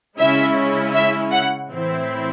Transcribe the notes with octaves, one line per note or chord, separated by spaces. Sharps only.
C#3 G#3 C#4 E4 E5
E5
F#5
A2 E3 C4 E4